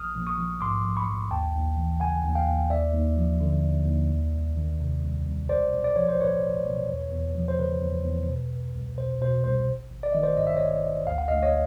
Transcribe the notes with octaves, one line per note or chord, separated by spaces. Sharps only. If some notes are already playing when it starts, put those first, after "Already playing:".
Already playing: A#1 D#6 F6
A#1
C#6 D#6
F3
G#2 C6 D6
A#1
B5 C#6
A#1
D#2 G5 A5
D#2
E3
C#3 F#5 G#5
D#2
F5 G5
D#2
D#2 D5 E5
D#2
F3
D3
D#2
D#2
C2
C2
D#3
C3
C2
C2
B1 C5 D5
B1
D5
F3 C#5
C5
A2 B4 C#5
B1
B1
E2
E2
F3
C5
C#3 B4
E2
E2
B2
C2
C2
B2 C5
B2 C5
C2 C5
G#1
G#1
D5
D#3 D#5
C5 D5
G2 D#5
E5
G#1 C#5 D#5
G#1
D2 F5
F#5
D2 D#5 F5
C#5 D#5